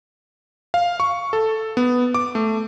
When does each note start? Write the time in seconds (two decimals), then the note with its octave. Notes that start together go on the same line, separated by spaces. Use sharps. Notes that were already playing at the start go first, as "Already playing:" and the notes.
0.74 F5
1.00 C#6
1.33 A4
1.77 B3
2.14 D6
2.35 A3